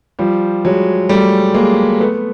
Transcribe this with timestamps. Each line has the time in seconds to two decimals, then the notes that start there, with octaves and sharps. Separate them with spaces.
0.19 F3 G3
0.65 F#3 G#3
1.09 G3 A3
1.54 G#3 A#3
2.00 A3 B3